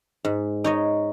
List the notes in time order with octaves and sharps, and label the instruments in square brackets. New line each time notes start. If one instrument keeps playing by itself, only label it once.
[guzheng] G#2
D#4 C#5 D#5